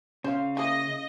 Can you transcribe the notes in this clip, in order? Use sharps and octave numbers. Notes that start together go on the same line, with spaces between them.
C#3 C#4 C5 F5
E3 A#3 D#5